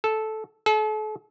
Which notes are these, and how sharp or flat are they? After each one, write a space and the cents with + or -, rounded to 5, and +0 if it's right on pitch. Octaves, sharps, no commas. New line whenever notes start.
A4 -10
A4 -40